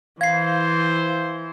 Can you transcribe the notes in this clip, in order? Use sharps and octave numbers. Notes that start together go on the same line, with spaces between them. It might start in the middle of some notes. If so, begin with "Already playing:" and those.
E3 C5 F5 G#6 C7